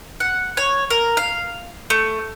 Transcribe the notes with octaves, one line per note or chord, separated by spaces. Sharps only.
F#5
C#5
A#4
F5
A3